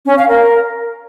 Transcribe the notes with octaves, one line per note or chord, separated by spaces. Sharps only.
C#4
F5
A#4